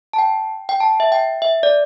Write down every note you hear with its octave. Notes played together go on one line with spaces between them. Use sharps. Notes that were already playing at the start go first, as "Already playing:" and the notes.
A5
G5
G5
A5
E5
G5
E5
D5